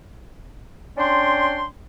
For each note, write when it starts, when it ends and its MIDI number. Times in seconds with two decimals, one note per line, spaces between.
0.97 1.65 61
0.97 1.65 62
0.97 1.65 74
0.97 1.65 79
0.97 1.65 84